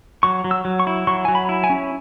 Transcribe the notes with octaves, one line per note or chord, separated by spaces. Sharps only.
F#3 C#6
F#3
E6
F#3
C#6
E4
F#3 C#6
F#3 G#5
B5
E4
G#5
C#4